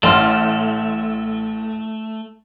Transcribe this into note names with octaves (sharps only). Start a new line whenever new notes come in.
A1 A3 C6 F6